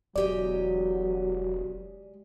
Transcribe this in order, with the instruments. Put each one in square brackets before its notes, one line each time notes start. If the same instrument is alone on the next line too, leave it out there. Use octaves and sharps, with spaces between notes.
[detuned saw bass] E1 [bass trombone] F#3 [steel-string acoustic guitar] G#3 G4 D#5 [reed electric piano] D5